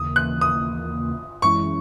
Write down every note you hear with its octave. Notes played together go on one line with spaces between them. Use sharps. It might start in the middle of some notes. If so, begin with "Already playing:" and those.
Already playing: D#2 C#3 E3 A#3 D#6
F#6
D#6
F#2 E3 G#3 C#4 E4 C#6